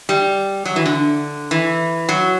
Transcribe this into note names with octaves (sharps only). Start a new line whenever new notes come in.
G3
F#3
E3
D3
E3
F#3